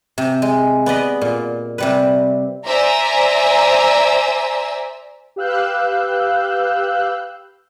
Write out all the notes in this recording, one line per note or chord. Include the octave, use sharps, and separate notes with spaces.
C3
G#3
B3 D5 D#5 B5
A#2
C3 G3 B4
C5 D5 E5 G#5 A#5 E6
G4 B4 F5 E6 F#6 G6